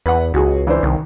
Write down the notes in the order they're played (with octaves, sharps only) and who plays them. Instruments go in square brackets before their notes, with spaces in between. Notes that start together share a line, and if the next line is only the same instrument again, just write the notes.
[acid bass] E2 [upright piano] B4 F#5
[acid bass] C#2 [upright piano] F#4 G#4
[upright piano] E3 D4 C5
[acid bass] C2 [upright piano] D#3